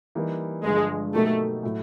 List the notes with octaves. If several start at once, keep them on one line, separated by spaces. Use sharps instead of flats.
E3 G3 A#3 D#4
G2 D3 F3 G#3
B2 F#3 A3 A#3 D#4 G4
A2 F#3 A3